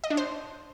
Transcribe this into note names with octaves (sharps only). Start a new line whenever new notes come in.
D#5
D4
C5